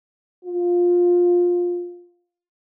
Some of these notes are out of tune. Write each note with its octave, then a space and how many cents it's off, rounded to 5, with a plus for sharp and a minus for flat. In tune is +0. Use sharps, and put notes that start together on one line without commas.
F4 +15